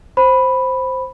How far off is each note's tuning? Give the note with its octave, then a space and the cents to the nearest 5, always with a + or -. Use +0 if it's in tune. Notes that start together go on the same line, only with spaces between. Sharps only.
C5 +0 B5 +0